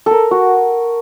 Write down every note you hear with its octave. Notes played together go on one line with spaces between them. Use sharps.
A4 A#4
F#4